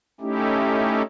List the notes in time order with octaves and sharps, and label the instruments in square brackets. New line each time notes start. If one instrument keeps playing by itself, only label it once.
[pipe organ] A3 C#4 D#4 E4 G4